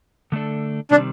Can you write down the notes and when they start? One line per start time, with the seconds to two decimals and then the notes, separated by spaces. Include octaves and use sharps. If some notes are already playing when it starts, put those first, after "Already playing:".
0.32 D3 A3 D4 A4
0.91 C3 D#3 G3 C4 D4